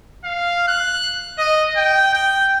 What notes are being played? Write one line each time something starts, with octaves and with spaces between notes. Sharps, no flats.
F5
F#6
D#5
G5
G5